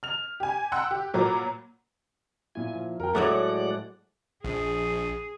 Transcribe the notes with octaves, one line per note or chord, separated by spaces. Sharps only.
F6 F7
G4 G#5
F#5 G5 C6 E6 F#6
G4
A#2 F#3 B4 A#5 D6
A#2 E4 G#5
F3
F2 A#4 G5
A2 F#3 G#3 A3 G#4 D5 F#5 D6
A#1 G#4